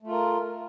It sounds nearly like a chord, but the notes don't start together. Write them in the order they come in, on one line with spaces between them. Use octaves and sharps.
A3 F4 A#4